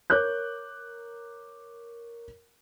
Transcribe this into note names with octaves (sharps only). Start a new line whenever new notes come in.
A#4 C#5 D6 F#6 G6